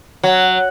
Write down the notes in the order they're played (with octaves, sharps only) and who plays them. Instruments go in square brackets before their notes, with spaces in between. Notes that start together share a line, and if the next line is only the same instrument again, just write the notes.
[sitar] F#3